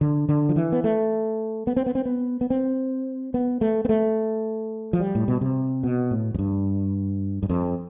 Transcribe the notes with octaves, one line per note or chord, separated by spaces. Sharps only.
D3
D3
F3
E3
B3
A3
B3
C4
B3
C4
B3
B3
C4
B3
A3
B3
A3
F3
G3
A2
B2
C3
B2
A2
F2
G2
G2
F2